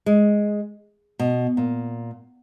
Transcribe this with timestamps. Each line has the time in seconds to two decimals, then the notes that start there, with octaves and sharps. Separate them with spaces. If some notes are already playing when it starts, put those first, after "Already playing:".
0.06 G#3
1.19 B2
1.57 A#2